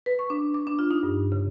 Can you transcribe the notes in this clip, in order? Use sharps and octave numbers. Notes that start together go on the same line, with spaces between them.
B4
C#6
D4
D6
D4
F4
D#4
G2
C#3